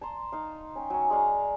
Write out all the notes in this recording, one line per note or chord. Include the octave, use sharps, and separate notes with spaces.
A5 A#5 C6
D#4 F5
C#4 G5
F#3 C#4
G#3 D5 F5 A#5